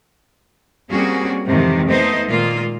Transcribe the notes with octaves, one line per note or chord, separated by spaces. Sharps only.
G3 A#3 C4 C#4 F#4 G#4
F2 G#2 C3 D#3 E3
A3 B3 D#4 C5 D#5
A#2 D#3 G#3 A#3 F4